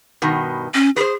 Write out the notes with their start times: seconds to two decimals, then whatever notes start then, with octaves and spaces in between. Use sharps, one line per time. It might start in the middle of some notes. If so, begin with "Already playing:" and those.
0.22 G2 B2 D#3
0.74 C#4
0.96 G#4 B4 C5